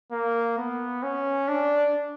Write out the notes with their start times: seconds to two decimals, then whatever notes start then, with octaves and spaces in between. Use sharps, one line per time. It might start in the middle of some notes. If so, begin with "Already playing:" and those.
0.12 A#3
0.58 B3
1.03 C#4
1.48 D4